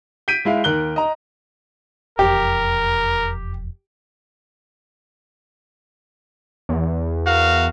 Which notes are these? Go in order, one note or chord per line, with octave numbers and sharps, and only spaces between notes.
G6 B6 D7 D#7
G#3 E4 F5
D#2 A#4 F#6 G7
D#5 A#5
E1 F2 G4 A#4
E2
F#4 A#4 F5